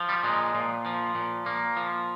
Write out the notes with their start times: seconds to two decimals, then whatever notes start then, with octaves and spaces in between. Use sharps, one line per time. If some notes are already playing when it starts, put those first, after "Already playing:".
Already playing: F3
0.09 G3
0.23 A#2 G#3
0.55 A#2
0.86 F3
1.15 A#2
1.46 A#2 A#3
1.77 F3